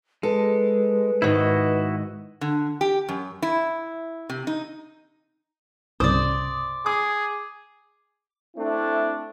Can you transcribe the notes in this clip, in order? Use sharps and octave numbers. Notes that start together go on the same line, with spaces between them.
G#3 A4 B4
G#2 D#3 E4 F#4 D#5
D3
G4
F#2
E4
C3
D#4
C2 G2 C#3 C5 D5 D6 D#6
G#4 D6
A3 C4 D4 E4